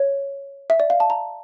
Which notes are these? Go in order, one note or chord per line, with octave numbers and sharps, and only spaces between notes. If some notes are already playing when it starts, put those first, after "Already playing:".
Already playing: C#5
E5
D5
F5
A5
A#5